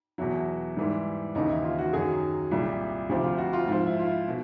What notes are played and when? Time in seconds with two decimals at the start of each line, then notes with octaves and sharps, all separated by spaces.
0.18 E2 B2 F#3 E4
0.77 G#2 E3 G3
1.35 D#2 C#3 E3 D#4
1.49 E4
1.64 F4
1.78 F#4
1.93 F#2 D#3 F#3 G#4
2.51 C2 A#2 G3
3.09 D2 C3 F3 G4
3.24 F4
3.38 F#4
3.53 F4
3.68 G#2 F3 F4
3.86 E4
3.99 F4
4.06 E4
4.28 B2